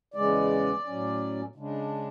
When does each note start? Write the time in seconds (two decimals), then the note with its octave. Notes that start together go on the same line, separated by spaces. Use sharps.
0.14 E2 C#3 G#3 D5
0.85 A2 F#3 C#4
1.56 C#3 G#3 D4